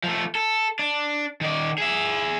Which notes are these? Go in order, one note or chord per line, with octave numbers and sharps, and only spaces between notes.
F3 A3
A4
D4
D#3 D5
G#4 E5